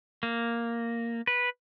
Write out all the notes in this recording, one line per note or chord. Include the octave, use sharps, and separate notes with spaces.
A#3
B4